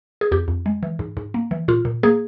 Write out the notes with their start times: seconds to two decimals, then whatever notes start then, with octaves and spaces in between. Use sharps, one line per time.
0.21 G#4
0.32 F2 G4
0.48 F2
0.66 G#3
0.83 E3
0.99 G#2
1.17 G#2
1.34 A#3
1.51 E3
1.68 A#2 F4
1.85 A#2
2.03 A#3 G#4